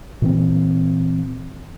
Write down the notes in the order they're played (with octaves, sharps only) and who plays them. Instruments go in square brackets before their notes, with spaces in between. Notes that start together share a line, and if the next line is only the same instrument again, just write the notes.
[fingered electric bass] A#2 E3 C4